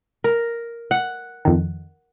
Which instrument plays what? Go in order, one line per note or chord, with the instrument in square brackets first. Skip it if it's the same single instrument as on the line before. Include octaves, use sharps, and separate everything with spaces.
[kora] A#4
F#5
[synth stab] F2 D#3